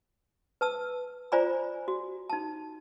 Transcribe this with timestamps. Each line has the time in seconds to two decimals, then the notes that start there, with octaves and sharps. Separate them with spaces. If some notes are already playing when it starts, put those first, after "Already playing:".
0.61 B4 A5 E6
1.32 F4 C5 D5 G#5 A#5 B5
1.88 F#4
2.30 D#4 A5